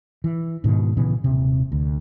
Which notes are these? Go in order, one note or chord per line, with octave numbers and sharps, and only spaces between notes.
E3
G#2 B2 D#3
A#2 C#3 E3 B3
D#1 C3
D2